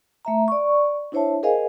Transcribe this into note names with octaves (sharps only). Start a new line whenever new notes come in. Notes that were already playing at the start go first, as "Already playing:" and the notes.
A3 E5 A#5
D5 C#6
D4 E4 C5 C#5 E5 A5
G#4 A#4 C5 D#5 F5 G#5